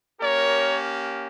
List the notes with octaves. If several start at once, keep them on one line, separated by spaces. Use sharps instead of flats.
A#3 C#4 G4 A#4 C#5